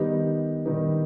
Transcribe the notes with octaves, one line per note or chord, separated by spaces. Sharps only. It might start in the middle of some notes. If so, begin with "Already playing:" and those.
Already playing: D#3 G3 B3 D#4 G4
D#3 G3 B3 D#4 G4